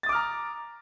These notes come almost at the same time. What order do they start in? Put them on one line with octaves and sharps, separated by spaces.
A6 D#6 D6 F6 A#5